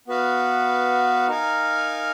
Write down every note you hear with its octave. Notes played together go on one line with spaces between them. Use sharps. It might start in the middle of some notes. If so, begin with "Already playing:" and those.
B3 F#4 B4 F5
D#4 A#4 F5 G#5